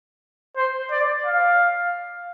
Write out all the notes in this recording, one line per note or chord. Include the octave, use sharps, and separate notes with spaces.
C5
D5
F5